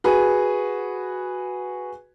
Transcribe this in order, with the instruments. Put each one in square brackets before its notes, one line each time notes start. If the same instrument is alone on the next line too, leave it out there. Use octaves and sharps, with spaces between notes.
[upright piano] F#4 G#4 B4